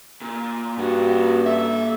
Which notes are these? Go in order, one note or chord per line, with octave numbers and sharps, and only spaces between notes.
A#2
G2 A#3 F#4 F#5
A4 E5